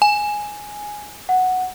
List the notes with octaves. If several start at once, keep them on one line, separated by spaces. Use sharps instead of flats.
G#5
F#5